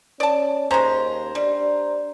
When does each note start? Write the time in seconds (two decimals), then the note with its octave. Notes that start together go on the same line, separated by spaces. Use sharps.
0.20 C#4 D5 A5
0.71 D#2 G#3 C#4 C5 A#5
1.35 G3 D4